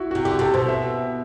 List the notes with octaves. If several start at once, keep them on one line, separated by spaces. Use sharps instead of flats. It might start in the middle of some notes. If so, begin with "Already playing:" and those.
Already playing: E4 F#4
F#4
C3
D3 G4
C3 A4
B2 C5
E5